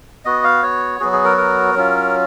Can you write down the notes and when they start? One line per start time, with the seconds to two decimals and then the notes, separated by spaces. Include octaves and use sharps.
0.25 B3 F#4 D#5
0.44 F5
0.63 C#5
1.00 F#3 B3 F#4 G#4
1.13 G#4
1.24 A#4
1.37 A#4
1.74 F#3 C#4 F4